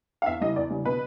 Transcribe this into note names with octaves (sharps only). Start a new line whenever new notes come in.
F5
E2 E5
C#3 E3 G3 D#5
E2 D5
C#3 E3 G3
B2 B4